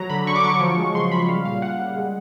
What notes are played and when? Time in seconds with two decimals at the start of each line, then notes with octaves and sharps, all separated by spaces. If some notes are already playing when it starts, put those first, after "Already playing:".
Already playing: F#3 A#5
0.10 D3 B5
0.27 D3 C#6
0.36 D6
0.44 F#3 C#6
0.60 F3
0.77 G#3
0.95 C#3 C6
1.11 C#3 B5
1.29 G3 F5
1.45 A#2 F5
1.62 A#2 F#5
1.79 G3
1.97 G#3